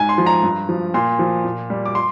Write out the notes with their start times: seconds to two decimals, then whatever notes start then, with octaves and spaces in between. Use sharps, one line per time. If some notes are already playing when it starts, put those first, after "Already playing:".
Already playing: G#2 G#5
0.09 C6
0.18 F3
0.26 A#5
0.43 G2
0.69 F3
0.94 A#2 C6
1.19 F3
1.45 A#2
1.70 G3
1.86 D6
1.95 C6